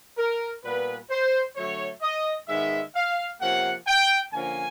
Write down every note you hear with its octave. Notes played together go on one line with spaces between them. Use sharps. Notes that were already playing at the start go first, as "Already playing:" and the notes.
A#4
A#2 G3 B3 B4
C5
D3 F#3 A3 C#5
D#5
G#2 D#3 G#3 B3 E5
F5
C3 F3 A#3 C#4 F#5
G5
D3 F3 A#3 C#4 G#5